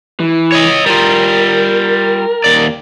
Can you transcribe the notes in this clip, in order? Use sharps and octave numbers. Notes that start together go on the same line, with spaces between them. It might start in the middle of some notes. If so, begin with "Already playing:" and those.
E3
C#5 D#5
G3 F4 A#4
D#2 D5